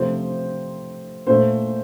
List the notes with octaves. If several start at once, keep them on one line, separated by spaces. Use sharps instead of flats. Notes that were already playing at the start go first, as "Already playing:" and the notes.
Already playing: C3 F3 A3 C5
A#2 A3 C5